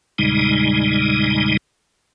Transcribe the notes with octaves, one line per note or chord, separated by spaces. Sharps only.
E2 A#2 C#3 G3 G#3 D#4